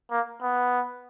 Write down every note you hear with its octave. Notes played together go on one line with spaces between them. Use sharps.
A#3
B3